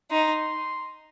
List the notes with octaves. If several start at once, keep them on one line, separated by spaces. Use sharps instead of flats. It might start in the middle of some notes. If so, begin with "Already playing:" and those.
D#4 C6